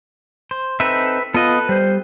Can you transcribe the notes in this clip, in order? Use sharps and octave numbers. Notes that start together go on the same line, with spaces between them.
C5
C4 D#4 A4 B4 E5
B3 F4 A4 B4 D#5
G3 C5